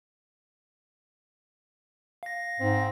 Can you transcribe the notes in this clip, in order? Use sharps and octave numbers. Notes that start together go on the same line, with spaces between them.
F5 A#6
G#2 C4